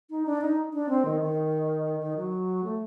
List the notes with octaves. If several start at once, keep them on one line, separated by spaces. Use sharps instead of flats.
D#4
D4
D#4
D4
C4
D#3
D#3
D#3
F#3
A3